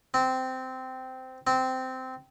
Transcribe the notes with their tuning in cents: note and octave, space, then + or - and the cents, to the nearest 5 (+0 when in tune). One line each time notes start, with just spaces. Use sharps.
C4 -15
C4 -15